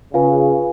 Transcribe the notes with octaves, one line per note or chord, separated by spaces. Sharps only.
C#3 F4 B4 F5 G#5